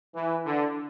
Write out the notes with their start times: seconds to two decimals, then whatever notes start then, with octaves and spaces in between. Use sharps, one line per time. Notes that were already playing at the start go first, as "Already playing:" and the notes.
0.14 E3
0.45 D3